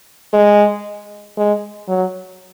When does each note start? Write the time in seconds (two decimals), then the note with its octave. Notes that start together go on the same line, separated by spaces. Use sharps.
0.33 G#3
1.37 G#3
1.88 F#3